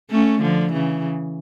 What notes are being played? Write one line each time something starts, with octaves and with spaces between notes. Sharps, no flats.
A3 C#4
D3 F3
C#3 E3